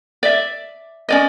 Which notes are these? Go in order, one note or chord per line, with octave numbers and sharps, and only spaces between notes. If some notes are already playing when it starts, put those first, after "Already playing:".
D5 E5
C#4 D5 D#5